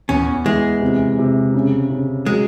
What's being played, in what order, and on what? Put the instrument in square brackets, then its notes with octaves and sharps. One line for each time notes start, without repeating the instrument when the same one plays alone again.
[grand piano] E2 [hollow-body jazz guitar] C#4
[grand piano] E3 [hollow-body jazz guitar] G#3
[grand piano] C3
C3
C#3
C#3
[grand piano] F#3 [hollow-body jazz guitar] G#3